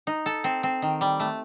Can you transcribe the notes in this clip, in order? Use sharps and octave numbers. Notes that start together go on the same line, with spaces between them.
D#4
A4
C4
C4
D#3
G3
A3